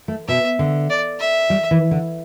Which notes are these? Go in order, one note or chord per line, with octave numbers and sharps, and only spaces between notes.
A3
B2 E5
D3
D5
E5
G3
E3
D3